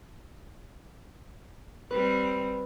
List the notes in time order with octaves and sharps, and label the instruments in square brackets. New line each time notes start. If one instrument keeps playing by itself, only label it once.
[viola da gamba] G3 C4 [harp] B4